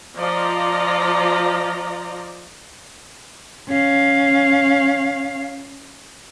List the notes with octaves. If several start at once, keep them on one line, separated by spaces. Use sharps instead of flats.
F3 F4 D5 D#5 A#5
C#4 F5